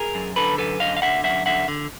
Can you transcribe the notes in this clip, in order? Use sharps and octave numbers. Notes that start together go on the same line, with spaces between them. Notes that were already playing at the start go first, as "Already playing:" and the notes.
Already playing: G#4 A#4
F#2
D3 A4 B4
F#2 A4 B4
D3 D#5 F5
F5
D3 E5 F#5
F#2 E5 F#5
D3 E5 F#5
D3